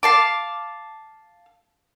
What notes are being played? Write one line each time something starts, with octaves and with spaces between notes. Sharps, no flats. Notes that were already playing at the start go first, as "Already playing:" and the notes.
F5 A5 D6